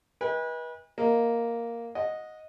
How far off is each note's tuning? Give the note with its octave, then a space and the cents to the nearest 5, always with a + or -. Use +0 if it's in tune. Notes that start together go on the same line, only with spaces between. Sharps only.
B4 -30 D#5 +35 G#5 -45
A#3 +0 D#5 +5
D#5 +0 F#5 -20